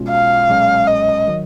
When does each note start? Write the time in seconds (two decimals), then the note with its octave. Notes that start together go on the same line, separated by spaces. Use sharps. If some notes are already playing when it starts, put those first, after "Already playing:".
Already playing: B1 B2 G#3 C#4 F4
0.10 F5
0.48 B1 A#2 G#3 C#4
0.87 D#5
1.27 D#3 F#3